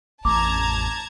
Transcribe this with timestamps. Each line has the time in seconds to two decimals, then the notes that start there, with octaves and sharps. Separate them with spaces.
0.25 A1 F2 B3 A5 A#5 D6 G#6